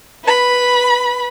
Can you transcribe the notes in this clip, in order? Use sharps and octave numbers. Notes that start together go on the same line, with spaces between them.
B4 B5